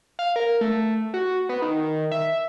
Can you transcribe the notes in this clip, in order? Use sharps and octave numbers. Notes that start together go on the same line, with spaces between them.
F5
A#4
A3
F#4
B3
D#3
E5